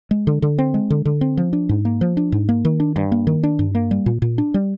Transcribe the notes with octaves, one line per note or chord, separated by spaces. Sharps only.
G#3
D3
D3
C4
G#3
D3
D3
C4
F3
D4
G#2
A#3
F3
D4
G#2
A#3
D#3
D4
G2
A#3
D#3
D4
G2
A#3
G3
A#2
A#2
D4
G3